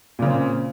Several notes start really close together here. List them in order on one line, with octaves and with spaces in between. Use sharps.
A#2 C#3 C4